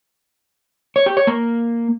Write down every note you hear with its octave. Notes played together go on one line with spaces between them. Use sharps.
C#5
G4
C#5
A#3